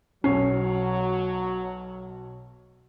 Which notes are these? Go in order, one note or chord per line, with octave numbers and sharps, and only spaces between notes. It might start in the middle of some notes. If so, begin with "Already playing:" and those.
B1 B2 F#3 C#4 C#5 C7